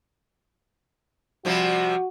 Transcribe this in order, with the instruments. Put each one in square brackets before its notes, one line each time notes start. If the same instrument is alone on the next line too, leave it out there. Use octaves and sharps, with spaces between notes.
[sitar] C3 F3 G3 [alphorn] F#4